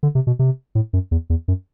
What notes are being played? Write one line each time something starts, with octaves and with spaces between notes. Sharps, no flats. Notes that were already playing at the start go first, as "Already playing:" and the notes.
D3
C3
B2
C3
A2
F#2
E2
E2
F#2